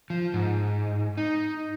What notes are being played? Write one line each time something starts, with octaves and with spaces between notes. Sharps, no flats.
F3
G#2
D#4